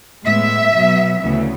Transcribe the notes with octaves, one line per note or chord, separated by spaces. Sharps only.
A2 G#3 B3 E5
B2 F#3 B3
D2 C#3 E3 B3